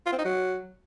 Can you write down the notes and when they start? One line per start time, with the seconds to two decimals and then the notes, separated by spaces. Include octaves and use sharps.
0.06 F4
0.12 C4
0.18 D#4
0.25 F#3